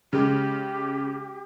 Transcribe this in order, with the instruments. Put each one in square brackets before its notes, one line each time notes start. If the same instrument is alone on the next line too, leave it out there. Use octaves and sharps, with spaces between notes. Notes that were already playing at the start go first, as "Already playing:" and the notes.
[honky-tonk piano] C#3 G#3 [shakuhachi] G4